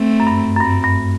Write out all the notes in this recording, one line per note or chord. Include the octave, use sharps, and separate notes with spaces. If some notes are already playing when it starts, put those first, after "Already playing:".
Already playing: A3 C4
F#2
G2
F#2
G2 A3 C4
G2